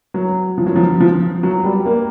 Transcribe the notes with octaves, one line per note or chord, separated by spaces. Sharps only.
F#3
F3
F#3
F3
F3
F#3
G3
A#3